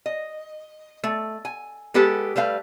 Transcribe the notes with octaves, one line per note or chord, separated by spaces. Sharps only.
D#5
A3
G#5
G#3 B3 G4 A4 B4
G3 A3 B4 F5